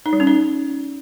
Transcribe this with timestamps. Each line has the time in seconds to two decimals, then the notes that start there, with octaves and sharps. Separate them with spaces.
0.06 D#4
0.13 G3
0.20 C#4
0.27 D#4